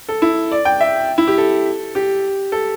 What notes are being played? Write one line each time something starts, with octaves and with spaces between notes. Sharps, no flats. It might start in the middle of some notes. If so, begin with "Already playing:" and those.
A4
E4
D5
G5
E5
E4
G4
A4
G4
A4